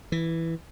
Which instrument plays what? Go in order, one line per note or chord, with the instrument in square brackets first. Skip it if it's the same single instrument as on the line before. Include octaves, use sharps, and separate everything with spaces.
[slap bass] E3